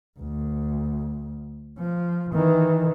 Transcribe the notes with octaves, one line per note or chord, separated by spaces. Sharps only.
D2
F3
D#3 E3